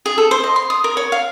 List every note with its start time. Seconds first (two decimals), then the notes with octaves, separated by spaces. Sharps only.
0.06 G#4
0.18 A4
0.31 C5
0.44 D#5
0.56 C6
0.70 D#6
0.84 A#4
0.97 C#5
1.12 F5